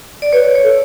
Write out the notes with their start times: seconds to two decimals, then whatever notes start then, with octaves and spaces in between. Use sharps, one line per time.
0.22 D5
0.33 B4 C#5
0.55 C#5
0.64 A4